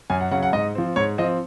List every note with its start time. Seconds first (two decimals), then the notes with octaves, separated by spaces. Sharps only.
0.10 F#2 G#5
0.20 F#5
0.31 C#3 F#3 C#4 F#5
0.43 F#5
0.53 G#2 D#5
0.75 F3 C4
0.96 G#2 C#5
1.18 F3 C4 D#5